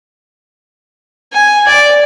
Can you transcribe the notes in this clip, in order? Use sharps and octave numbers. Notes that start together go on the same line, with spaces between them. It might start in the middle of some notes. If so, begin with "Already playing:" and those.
G#5
D5